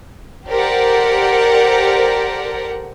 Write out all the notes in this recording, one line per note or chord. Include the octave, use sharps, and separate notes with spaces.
G4 A4 A#4 C5 D5 F#5